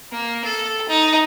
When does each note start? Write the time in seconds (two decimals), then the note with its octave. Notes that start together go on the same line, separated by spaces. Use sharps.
0.12 A#3
0.45 A4
0.89 D#4